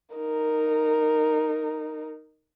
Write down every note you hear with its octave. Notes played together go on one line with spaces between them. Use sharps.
D#4 A#4